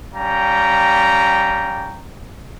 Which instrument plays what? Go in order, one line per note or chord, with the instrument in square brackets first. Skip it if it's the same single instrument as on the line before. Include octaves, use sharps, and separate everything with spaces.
[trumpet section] G3 C#4 F5 G5 A#5